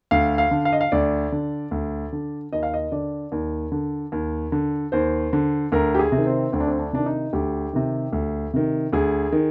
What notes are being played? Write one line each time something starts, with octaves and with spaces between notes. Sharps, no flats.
D2 F5
F5
D3
F5
D#5
F5
D2 D5
D3
D2
D3
D#2 D#5
F5
D#5
D3 D5
D#2
D3
D#2
D3
D#2 C5
D3
D2 A#4
G4
G#4
C3
D#3
C4
D2 C4
D4
C4
D4
C3 D#3 D4
D#4
D2 G4
C3 D#3
D2
C3 D#3
D2 G#4
D#3